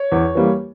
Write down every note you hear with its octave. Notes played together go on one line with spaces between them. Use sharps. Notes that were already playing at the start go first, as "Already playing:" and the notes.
Already playing: C#5
E2
E3 G3 A#3